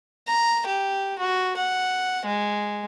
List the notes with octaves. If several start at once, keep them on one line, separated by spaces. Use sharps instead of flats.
A#5
G4
F#4
F#5
G#3